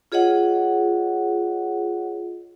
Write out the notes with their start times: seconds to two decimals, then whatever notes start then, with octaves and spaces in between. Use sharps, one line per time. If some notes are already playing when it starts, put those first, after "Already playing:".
0.12 F4 G#4 C#5 D#5 F#5